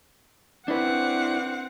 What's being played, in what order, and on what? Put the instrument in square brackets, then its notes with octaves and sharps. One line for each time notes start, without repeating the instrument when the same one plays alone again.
[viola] C4 F#5 [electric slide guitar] D4 E4 B4